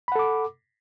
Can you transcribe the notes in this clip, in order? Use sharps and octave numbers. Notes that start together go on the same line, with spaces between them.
A4 F#5 B5 D6